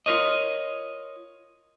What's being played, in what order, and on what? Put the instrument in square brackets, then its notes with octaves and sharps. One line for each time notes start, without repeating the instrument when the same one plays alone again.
[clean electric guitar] F4 G4 A#4 C#5 D#5